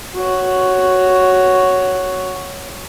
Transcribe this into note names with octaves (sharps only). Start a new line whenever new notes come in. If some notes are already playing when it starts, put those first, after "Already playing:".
F#4 C#5